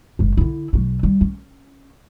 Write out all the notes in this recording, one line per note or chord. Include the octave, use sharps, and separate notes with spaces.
F#1 G#3
D3 E4
B1 F#3
G3
C#4